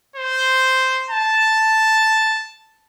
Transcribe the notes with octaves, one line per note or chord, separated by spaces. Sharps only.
C5
A5